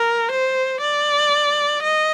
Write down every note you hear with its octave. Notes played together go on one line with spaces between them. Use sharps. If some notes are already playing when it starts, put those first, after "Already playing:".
Already playing: A#4
C5
D5
D#5